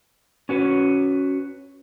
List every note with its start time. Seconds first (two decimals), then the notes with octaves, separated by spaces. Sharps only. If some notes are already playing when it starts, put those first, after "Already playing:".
0.49 C#4 F#4 B4 C#5